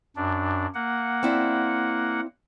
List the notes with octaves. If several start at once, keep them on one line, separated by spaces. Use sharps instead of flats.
F#2 D4
A#3 F#5
C4 E4 D5